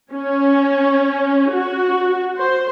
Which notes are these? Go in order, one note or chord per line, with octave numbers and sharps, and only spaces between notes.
C#4
F#4
C5